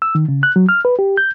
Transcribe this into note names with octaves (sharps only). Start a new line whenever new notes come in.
E6
D#3
C#3
F#6
F#3
F6
B4
G4
G6